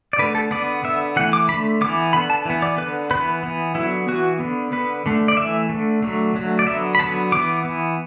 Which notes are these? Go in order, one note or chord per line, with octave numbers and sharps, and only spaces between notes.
D5
D3 A3 B4
A4
D3 B3 D5
D3 B3 E5
E3 A3 F#5
D6
D3 A3 B5
E3 B3 D6
D3 B3 B5
A5
E3 B3
D5
D3 B3 B4
E3 B3 B4
E3 B3
D3 F#3 B3 E4
E3 B3 F#4
D3 B3
D3 B3 B4
D3 A3
D5
E3 A3 E5
D3 A3
D3 F#3 A3
D3 F#3 A3
D5
D3 F#3 B3 E5
B5
D3 F#3 B3 A5
E3 B3 D6
E3 B3